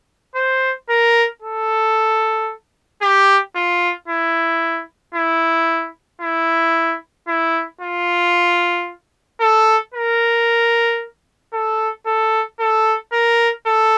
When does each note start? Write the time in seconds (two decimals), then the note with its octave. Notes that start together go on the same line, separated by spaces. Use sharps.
0.35 C5
0.89 A#4
1.42 A4
3.02 G4
3.56 F4
4.08 E4
5.14 E4
6.22 E4
7.28 E4
7.81 F4
9.41 A4
9.94 A#4
11.53 A4
12.07 A4
12.60 A4
13.13 A#4
13.66 A4